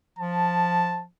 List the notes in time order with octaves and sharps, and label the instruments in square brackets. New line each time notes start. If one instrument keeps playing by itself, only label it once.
[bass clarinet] F3 [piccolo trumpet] A5